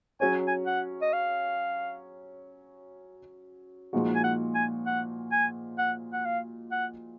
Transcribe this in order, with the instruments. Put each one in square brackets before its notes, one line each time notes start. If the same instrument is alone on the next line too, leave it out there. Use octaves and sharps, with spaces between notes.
[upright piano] F#3 C#4 G#4 C#5 [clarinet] G#5
[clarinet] G#5
F#5
D#5
F5
[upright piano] A#2 F3 G#3 D#4 F#4
[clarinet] G#5
F#5
G#5
F#5
G#5
F#5
F#5
F5
F#5